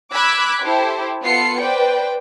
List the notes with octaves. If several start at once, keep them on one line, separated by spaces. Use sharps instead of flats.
B5 D6 E6 F#6 G#6 B6
E4 G4 A4 C5
B3 F4 A4 C7 C#7
B4 C5 D5 G5